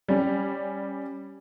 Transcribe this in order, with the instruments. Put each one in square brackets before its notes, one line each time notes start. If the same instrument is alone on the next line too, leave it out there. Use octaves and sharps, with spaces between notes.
[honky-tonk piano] G3 C#4